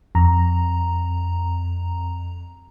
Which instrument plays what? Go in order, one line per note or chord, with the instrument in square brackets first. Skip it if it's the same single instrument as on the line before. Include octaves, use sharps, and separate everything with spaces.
[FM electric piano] F2 A#5